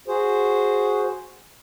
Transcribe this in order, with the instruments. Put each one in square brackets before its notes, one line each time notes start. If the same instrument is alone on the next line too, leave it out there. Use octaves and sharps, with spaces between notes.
[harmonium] F#4 G#4 C5